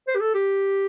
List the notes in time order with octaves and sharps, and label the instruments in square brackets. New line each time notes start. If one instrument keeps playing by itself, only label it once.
[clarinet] C5
G4
A4
G4